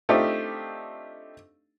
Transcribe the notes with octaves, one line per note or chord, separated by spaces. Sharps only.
A3 C4 D4 D#4 F4 G4